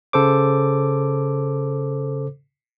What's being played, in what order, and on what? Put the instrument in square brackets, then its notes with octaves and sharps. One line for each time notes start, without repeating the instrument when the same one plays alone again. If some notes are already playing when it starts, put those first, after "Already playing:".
[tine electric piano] C#3 A4 C5 D6